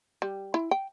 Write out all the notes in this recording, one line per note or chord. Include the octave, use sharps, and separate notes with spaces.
G3
E4
G5